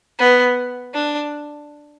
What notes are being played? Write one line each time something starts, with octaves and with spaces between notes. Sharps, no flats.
B3
D4